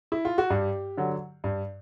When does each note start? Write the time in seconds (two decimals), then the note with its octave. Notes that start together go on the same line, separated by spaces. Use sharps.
0.12 E4
0.25 F4
0.38 F#4
0.50 G2 G4
0.97 D3 F#3
1.44 G2